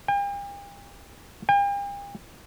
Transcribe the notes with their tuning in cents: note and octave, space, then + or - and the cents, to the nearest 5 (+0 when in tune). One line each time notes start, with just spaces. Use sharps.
G5 +45
G5 +45